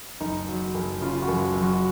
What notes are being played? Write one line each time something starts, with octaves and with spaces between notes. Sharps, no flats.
F#1 D#4
F#3
F#1
C#3 F4
F#4
F#1
F#2
F#4